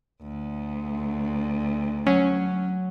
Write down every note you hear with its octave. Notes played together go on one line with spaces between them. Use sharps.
D2
F#3 C#4